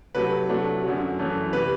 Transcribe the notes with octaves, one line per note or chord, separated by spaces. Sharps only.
C3 F#3 A3 B4
C3 F#3 A3 D4
F#2 D3 F#3
F#2 E3 A3
C3 E3 G3 B4